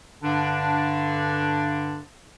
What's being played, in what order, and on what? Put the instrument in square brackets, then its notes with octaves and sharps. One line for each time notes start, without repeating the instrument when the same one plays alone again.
[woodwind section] G2 D3 D4